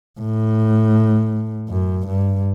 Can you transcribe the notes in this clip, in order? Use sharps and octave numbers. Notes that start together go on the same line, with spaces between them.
A2
F#2
G2